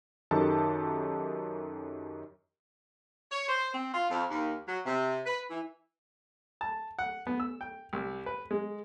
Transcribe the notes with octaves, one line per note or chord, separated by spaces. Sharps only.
F#2 D#3 G4 A4 A5
C#5
C5
C4
F4
F2
D#2
F#3
C3
B4
E3
A5
F#5
B3
E6
G5
C2
B4
G#3